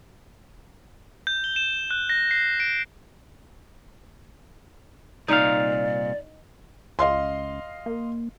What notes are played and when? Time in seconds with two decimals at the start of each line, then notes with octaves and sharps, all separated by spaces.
1.27 G6
1.44 G7
1.56 E7
1.91 F#6
2.10 A#6
2.31 C7
2.60 D7
5.28 C2 A#2 D#4 D5 F5
6.99 C#2 D#5 F5 C6
7.86 A#3